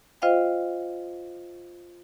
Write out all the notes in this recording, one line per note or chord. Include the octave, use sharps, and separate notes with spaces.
F4 C5 D#5 F5 G5